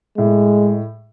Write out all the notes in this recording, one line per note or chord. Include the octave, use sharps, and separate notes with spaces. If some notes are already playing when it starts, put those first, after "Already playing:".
A2 G#3